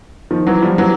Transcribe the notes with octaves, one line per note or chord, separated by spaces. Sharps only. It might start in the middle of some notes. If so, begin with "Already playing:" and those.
D#3 F3
E3 F#3
F3 G3
E3 F#3